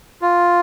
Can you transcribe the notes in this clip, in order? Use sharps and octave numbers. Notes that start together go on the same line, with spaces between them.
F4